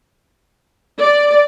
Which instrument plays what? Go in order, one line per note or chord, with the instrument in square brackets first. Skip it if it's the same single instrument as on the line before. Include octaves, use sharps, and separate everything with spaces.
[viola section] D5